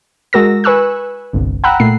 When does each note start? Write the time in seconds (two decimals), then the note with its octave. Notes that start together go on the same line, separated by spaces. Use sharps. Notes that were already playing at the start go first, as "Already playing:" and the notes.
0.33 G#3 F#4 A#4 E6 A#6
0.64 B4 G#5 C#6 E6 F#6
1.33 G1 C2
1.64 F#5 G5 A#5 B5 E6 F#6
1.80 A#2 A3 C7